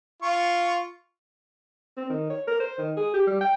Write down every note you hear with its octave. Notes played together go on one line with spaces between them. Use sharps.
F4 C#6
C4
D#3
C#5
A#4
C5
D#3
G#4
G4
G3
G5